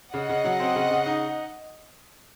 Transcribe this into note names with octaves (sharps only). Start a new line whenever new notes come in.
C#3 D#5 F#5
C#3
F#3
C4
C#3
C#3
D#4